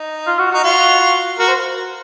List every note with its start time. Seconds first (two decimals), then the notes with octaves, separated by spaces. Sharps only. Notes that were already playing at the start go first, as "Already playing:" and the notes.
Already playing: D#4
0.27 F4
0.39 F#4
0.51 D#4 F#4
0.64 F4 F#4
1.38 F#4 A#4
1.48 C5